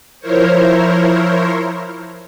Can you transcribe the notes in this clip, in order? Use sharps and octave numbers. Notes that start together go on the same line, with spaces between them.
F3 E4 A#4 C5 C#5